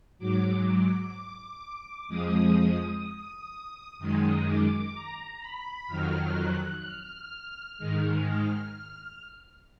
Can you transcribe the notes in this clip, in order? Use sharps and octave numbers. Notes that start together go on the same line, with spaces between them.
G#2 F#3 D6
F2 F3 G#3 D#6
F#2 D#3 G#3 D#6
D6
A#5
B5
F2 D#3 F#3 F6
F#6
F6
G#2 D#3 G#3
F6